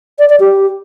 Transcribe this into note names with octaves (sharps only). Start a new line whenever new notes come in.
D5
D5
G4